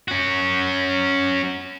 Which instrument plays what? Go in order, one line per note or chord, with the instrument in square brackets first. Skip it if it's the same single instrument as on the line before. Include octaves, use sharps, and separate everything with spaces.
[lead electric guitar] C#4 F#4